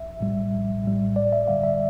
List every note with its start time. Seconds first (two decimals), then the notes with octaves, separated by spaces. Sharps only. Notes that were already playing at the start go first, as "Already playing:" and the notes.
Already playing: A#1 E5
0.20 A2 G3
0.52 A#1
0.84 A2 G3
1.16 A1 D5
1.33 E5
1.47 G2 D3 G3 F5
1.64 E5